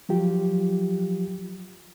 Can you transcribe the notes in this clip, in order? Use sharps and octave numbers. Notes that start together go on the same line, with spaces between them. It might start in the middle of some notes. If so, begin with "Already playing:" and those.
F3 F#3 F4 G4